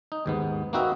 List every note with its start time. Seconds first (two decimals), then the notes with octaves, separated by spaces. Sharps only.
0.12 D#4
0.26 D#2 G#2 B3
0.73 A#3 C4 D#4 F#4 B4 E5